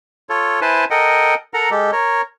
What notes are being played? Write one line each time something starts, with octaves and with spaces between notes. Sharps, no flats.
F4 A4 C#5
E4 B4 C5 G#5 A5
A4 A#4 D#5 F#5 G5
A4 A#4 F#5 A#5
G#3 G4 A4
A#4 C#5